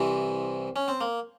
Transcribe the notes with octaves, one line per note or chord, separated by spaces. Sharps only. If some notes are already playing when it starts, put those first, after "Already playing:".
Already playing: C2 C3 E3
C#4
C4
A#3